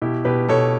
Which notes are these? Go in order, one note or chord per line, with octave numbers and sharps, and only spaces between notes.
B2 E4 G4
B2 G4 B4
B2 A4 C#5